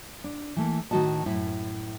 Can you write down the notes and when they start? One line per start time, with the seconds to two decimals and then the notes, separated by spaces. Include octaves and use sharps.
0.24 D4
0.56 E3 A3 A#3
0.91 A2 D#3 A3 F#4 D#5 A5
1.26 F#2 A2 E4